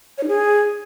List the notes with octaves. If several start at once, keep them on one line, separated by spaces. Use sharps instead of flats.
C#5
D#4
G#4